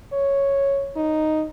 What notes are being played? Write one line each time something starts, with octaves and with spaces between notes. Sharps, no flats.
C#5
D#4